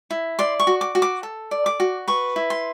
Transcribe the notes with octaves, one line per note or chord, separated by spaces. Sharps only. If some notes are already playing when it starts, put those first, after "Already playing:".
E4
D5 C6
C#6
F#4
D6
F#4
D6
A4
D5
D6
F#4
B4 C#6
E4
C6